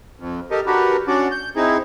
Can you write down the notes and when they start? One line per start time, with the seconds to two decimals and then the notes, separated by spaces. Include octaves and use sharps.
0.19 F2
0.51 G4 A4 A#4 D#5
0.67 D4 F#4 G4 A#4 B4
1.07 C#4 D4 F#4 D5
1.31 G6
1.56 C4 D#4 E4 G#4